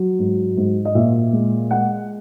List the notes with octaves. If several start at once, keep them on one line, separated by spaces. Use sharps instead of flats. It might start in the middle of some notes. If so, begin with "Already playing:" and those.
Already playing: F#3
G#2
G#2
D#5
A#2 E5
G#3
G#3 F#5